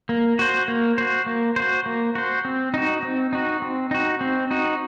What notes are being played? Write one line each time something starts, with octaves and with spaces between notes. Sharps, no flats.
A#3
F#4 C5
A#3
F#4 C5
A#3
F#4 C5
A#3
F#4 C5
C4
D#4 F#4
C4
D#4 F#4
C4
D#4 F#4
C4
D#4 F#4